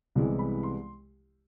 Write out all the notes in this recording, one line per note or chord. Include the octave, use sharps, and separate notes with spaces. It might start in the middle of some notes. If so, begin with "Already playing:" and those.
C2 C3 E3 G#3 B3
B5
C6